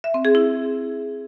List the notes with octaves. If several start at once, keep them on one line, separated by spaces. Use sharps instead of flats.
E5
C4
G#4
E4